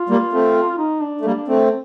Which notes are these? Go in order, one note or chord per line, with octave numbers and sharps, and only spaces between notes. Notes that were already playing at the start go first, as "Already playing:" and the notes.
Already playing: F4
G3 A#3
A3 C4
D#4
D4
A3
G3 A#3
A3 C4